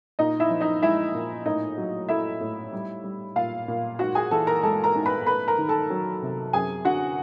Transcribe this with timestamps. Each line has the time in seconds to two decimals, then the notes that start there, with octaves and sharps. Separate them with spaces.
0.19 A#2 D#4 D#5
0.40 E4 E5
0.50 F3
0.61 D#4 D#5
0.82 G#3 E4 E5
1.15 A#2
1.45 A2 D#4 D#5
1.78 F#3
2.09 A3 E4 E5
2.41 A2
2.73 G3
3.04 G3
3.36 A#2 F4 F5
3.68 A#2
3.99 G#2 F#4 F#5
4.15 G#4 G#5
4.31 E3 A4 A5
4.47 A#4 A#5
4.63 G#3 A4 A5
4.84 A#4 A#5
4.95 G#2
5.06 B4 B5
5.26 A3 B4 B5
5.48 A#4 A#5
5.58 D#3
5.69 A4 A5
5.90 F#3
6.22 C3
6.53 F#2 G#4 G#5
6.85 D3 F#4 F#5